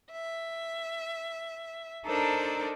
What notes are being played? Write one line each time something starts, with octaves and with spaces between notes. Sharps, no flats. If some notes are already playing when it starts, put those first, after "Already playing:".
E5
D4 D#4 A4 A#4 C5 D5